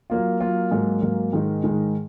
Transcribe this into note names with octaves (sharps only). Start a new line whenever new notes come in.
F#3 A#3 F4
F#3 A#3 F4
G#2 F#3 A#3
G#2 F#3 A#3
G#2 D#3 G#3 D#4
G#2 D#3 G#3 D#4